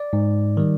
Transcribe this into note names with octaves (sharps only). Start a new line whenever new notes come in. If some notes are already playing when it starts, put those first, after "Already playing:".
Already playing: D5
G#2
D#3 G3